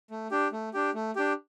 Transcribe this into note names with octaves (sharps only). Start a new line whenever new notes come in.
A3
D4 G4
A3
D4 G4
A3
D4 G4